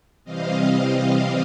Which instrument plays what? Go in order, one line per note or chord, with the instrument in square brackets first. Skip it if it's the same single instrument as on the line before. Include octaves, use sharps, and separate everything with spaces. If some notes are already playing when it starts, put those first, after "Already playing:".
[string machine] C3 E3 G3 C4 D#5 F5